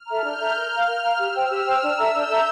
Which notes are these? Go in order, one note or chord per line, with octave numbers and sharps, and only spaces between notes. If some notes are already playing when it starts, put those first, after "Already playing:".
Already playing: F6
A4 E5 A#5
D4 G6
A4 E5 A#5
A#4 F6
F5 A#5
A#4
F5 A#5
G4 E6
C5 G5
G4 F6
C5 G5
D4 E6
A4 E5 A#5
D4 G6
A4 E5 A#5